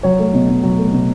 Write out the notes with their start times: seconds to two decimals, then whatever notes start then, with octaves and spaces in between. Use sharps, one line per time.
0.03 F#3 C#5
0.19 A3
0.33 B2
0.48 B2
0.63 F#3
0.78 A3
0.92 B2